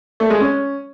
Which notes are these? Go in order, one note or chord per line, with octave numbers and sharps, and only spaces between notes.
A3
G#3
C#4